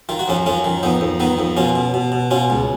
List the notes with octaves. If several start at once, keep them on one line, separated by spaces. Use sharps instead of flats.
D#3 F4
F#4
F2 C#4 F4
F2 C#4 F4
D#3
F2 B3 D#4
F2
D#3 B3 D#4
F2
B2 C#4 F4
B2
B2
B2
B2 C#4 F4
C#2